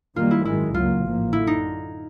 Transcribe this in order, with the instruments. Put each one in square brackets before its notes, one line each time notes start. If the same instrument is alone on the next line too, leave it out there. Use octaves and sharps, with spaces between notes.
[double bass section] F#2 D#3 G3 A#3 [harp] F4
[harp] E4
[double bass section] G#1 F#2 D#3 G#3 [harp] E4
[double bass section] C#2 C#3 F#3 A#3 [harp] F4
[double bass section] A1 G#2 F3 A#3
[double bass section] F#2 D3 [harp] E4
[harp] D#4